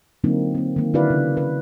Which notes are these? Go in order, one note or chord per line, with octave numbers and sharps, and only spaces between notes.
D3 F#3 A#3 C4 D#4 F4
A#3 C4
D#3 A#3
D3 E4 F#4 B4 D5 F5
C#3
B4